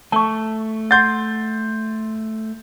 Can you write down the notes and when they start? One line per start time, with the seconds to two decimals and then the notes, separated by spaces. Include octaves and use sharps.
0.12 A3 A5 C#6
0.91 F#5 C6 G6 A6